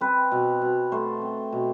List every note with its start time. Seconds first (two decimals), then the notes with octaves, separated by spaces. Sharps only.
0.01 C4 B4
0.31 B2
0.62 B2
0.92 A3 C5
1.22 C4
1.52 B2